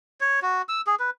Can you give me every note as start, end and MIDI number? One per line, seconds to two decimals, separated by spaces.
0.21 0.40 73
0.42 0.62 66
0.69 0.81 88
0.87 0.95 68
1.00 1.10 71